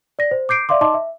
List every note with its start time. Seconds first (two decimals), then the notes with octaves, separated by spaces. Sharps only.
0.19 D5 A#6
0.31 C5
0.49 D6 G6 C7 D7
0.69 D5 E5 F5 C6 D6
0.81 D#4 D#5 A5 C6 D6
0.94 E5